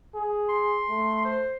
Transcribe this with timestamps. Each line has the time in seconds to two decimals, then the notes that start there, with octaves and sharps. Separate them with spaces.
0.15 G#4
0.49 C6
0.89 A3
1.25 C5